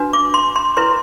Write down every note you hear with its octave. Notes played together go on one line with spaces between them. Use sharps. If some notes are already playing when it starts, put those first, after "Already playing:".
Already playing: D4 F#4 B4
D6
C6
C6
E4 B4 C6